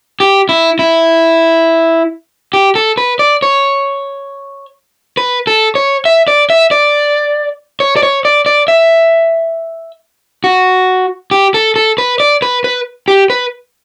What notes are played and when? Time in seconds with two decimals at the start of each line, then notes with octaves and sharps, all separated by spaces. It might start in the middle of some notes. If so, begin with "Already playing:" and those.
0.20 G4
0.49 E4
0.79 E4
2.53 G4
2.75 A4
2.97 B4
3.19 D5
3.42 C#5
5.17 B4
5.47 A4
5.75 C#5
6.05 E5
6.28 D5
6.50 E5
6.71 D5
7.80 C#5
7.96 D5
8.03 C#5
8.25 D5
8.46 D5
8.68 E5
10.44 F#4
11.31 G4
11.54 A4
11.76 A4
11.98 B4
12.20 D5
12.42 B4
12.64 B4
13.08 G4
13.30 B4